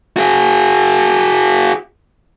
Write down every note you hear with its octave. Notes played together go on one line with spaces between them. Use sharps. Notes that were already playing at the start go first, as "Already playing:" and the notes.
F#4 G#4